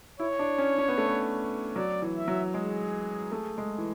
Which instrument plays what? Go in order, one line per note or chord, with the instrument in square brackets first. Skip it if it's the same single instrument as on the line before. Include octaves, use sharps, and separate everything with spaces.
[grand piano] E4 [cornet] C#5
[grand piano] D4
C#4
C#4
B3
A3
B3
[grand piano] F#3 [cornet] D5
[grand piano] E3
[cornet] E5
[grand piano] F#3
[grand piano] G#3 [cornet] G#4
[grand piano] A3
G#3
E3